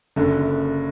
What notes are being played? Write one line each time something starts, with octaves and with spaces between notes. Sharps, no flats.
F#1 F#2 D3